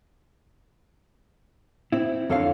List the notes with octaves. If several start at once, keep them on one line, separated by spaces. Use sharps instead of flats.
C4 E4
F2 D3 A4 C#5 F5 A5